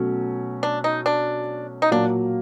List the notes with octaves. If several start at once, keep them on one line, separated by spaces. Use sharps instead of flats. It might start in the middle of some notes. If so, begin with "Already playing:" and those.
Already playing: B2 F#3 A3 C#4
D4
D#4
D4
D#4
A#2 F#3 A#3 D4